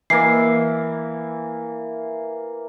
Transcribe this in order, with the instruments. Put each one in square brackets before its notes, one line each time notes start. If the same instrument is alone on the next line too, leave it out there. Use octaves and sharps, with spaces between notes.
[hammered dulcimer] E3 A#3 [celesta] C7